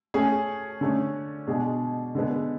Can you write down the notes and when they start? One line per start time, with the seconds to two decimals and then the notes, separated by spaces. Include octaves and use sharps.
0.14 A3 C#4 G#4
0.81 D3 A3 C#4
1.47 B2 G#3 D4 G#4
2.15 D3 G#3 B3